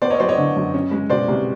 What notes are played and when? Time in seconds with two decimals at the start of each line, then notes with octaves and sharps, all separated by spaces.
0.02 B3 C5 D5
0.10 C#5 D#5
0.20 F#3 C5 D5
0.29 C#5 D#5
0.38 D3
0.57 F#2
0.74 C#4
0.91 G#3
1.10 B2 C5 D5
1.28 C2